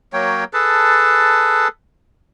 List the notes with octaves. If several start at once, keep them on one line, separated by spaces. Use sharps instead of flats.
F#3 A#3 C#5 G5
G#4 A4 B4 A5